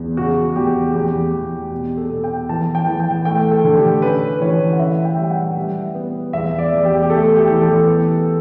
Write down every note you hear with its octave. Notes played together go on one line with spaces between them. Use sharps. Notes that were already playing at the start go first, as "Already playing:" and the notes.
Already playing: E2
C#3 F#4
E2 G4
E2 G4
E2
B2 G4
A4
B2
G5
E3 A5
G5
E3
G5
A3 G5
A4
D3
G4
C#4 B4
E3 C#5
F#5
C#4 E5
G5
G3
G5
F#5
G3
B3
E2 E5
D5
E2
G4
G4
A3 A4
G4
E3
A4
B3